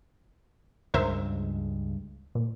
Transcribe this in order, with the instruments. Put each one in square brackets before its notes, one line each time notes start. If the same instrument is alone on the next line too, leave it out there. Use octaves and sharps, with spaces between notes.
[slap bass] C#2 G2 G#3 [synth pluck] A#4 C5 E5
[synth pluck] A#2